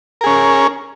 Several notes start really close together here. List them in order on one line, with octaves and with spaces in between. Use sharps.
A#4 G#4 C#4